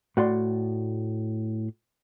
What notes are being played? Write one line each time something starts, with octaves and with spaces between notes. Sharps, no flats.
A2 F#4 D5 C6